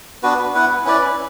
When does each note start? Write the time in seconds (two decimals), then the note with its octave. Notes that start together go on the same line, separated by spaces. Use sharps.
0.23 B3 D4 F#4 B4
0.54 B3 E4 B4 F#5
0.85 C#4 E4 B4 D5